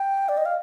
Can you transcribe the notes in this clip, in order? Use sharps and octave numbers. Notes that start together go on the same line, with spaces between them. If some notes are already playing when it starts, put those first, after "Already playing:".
Already playing: G5
D5
D#5
F5